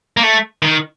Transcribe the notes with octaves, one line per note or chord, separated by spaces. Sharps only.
A#3
A3
D#3